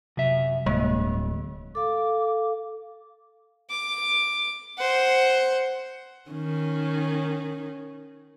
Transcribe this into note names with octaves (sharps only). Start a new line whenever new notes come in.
F#2 C3 E5
D1 G2 G#3 A#3
A4 F5 D6
D6
C5 F#5
D#3 C#4